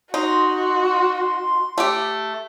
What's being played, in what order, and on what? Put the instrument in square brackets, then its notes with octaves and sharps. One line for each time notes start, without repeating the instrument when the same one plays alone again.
[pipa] D#4 [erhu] F#4 [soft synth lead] C6
[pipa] A3 G4